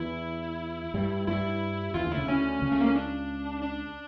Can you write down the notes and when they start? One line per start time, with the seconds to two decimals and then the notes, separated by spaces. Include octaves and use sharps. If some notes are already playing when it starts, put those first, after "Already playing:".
Already playing: E2 E3 E4
0.94 G2 G3
1.27 G2 G3 E4
1.94 E2 E3 F4
2.05 D2 D3
2.11 E4
2.17 C#2 C#3
2.28 D2 D3 C#4
2.62 C#2 C#3
2.72 A3
2.80 A#3
2.87 C#4
2.96 D4
3.62 D4